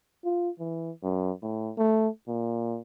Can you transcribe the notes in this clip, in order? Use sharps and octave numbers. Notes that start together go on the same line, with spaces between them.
F4
E3
F#2
A2
A3
A#2